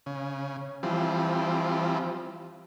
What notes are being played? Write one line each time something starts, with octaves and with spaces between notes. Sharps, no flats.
C#3
E3 F3 G3 C4